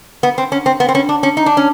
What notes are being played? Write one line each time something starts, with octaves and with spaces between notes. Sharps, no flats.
B3
C4
C#4
C4
B3
C4
C#4
D4
C#4
D#4
D4
C#4